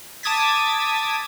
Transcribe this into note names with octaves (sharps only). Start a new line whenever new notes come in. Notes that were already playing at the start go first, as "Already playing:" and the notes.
A5 D6 D#6 G#6 A6 B6